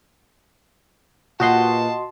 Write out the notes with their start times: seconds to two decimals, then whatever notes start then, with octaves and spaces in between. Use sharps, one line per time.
1.40 A#2 F#4 G4 B4 D#5 F#5 A5 C6